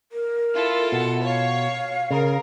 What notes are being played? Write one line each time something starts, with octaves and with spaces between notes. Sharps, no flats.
A#4
E4 F4 A4
B2 F#5
C#5 F5
C#3 A#4